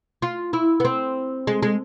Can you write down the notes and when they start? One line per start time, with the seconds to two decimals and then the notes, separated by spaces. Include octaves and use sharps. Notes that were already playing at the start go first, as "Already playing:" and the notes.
0.22 F4
0.53 E4
0.80 B3
0.85 C4
1.47 G#3
1.62 G#3